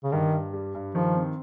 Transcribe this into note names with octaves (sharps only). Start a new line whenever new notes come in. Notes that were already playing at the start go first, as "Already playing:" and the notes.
C#3
G2 D#3
G2
G3
G2
D#3 F3
C4